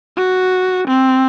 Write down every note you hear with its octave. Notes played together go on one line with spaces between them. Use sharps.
F#4
C4